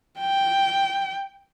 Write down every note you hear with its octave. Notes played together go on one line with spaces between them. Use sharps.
G5